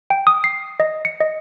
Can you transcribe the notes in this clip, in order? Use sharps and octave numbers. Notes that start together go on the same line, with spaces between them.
G5
D#6
C7
D#5
C#7
D#5